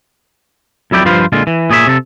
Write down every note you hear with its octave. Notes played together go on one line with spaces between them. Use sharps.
F2 F#3 E4 D5 G5
G2 F3 F4 B4 C5 F5
A#2 D3 G#3 F4
E3
A#2 G#4 C#5 D5 E5
C3 A4